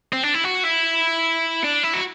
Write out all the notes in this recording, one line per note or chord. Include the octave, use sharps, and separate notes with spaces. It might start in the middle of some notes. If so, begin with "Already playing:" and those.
C4
D4
E4
F#4
E4
D4
E4
F#4